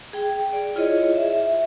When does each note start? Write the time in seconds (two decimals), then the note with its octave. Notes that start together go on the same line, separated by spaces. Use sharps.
0.13 G#4 G5
0.53 D5
0.75 E4 F4 G#4 C#5 D#5
1.16 E5